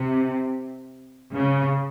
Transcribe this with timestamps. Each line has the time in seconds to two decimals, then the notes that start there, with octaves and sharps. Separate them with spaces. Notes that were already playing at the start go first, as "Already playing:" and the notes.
Already playing: C3
1.35 C#3